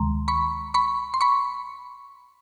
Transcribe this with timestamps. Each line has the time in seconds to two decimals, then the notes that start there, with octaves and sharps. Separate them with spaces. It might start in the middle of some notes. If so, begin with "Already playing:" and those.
Already playing: D2 C3 D#3 G#3 A#5 C6
0.28 B5 C#6
0.74 B5 C#6
1.14 C6
1.21 B5 C#6